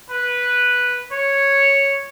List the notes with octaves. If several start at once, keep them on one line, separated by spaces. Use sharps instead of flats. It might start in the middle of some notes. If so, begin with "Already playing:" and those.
B4
C#5